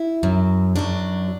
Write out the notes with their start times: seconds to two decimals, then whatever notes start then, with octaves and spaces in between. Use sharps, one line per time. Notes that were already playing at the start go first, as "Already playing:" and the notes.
Already playing: E4
0.23 F#2 F#3
0.76 F#2 F#3 D4